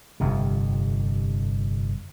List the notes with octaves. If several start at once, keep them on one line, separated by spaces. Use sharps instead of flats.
G1 F2 C3